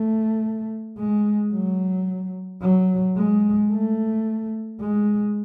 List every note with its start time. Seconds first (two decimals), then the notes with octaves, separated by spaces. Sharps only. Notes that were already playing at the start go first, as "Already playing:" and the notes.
Already playing: A3
0.98 G#3
1.53 F#3
2.62 F#3
3.16 G#3
3.71 A3
4.81 G#3